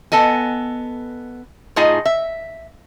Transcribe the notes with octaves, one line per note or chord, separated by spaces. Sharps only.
B3 A4 D#5 G#5
A2 D#4 F4 G#4 D#5 G#5
E5